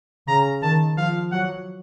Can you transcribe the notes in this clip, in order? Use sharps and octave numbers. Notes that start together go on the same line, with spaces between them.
C#3 A#5
D#3 A5
F3 F5
F#3 F#5